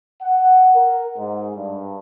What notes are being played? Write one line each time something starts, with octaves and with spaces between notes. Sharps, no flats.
F#5
A#4
G#2
G2